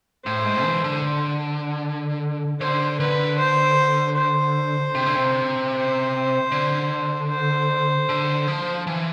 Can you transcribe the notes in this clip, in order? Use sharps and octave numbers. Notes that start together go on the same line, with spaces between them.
A2 C5
G#2
E3
D3
D3 C5
D3 B4
C5
C5
C3
D3
C3
C5
D3
C5
D3
F3
E3